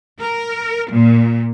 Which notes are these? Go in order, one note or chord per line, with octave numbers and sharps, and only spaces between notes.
A#4
A#2